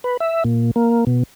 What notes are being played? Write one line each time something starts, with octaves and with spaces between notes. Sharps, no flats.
B4
E5
A#2
A#3
B2